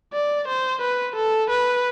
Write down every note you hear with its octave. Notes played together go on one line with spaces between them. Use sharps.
D5
C5
B4
A4
B4